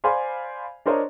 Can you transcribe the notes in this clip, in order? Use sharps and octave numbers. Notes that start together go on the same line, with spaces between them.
C5 D5 F5 G#5 B5 C6
D4 A#4 C5 C#5 D#5 A#5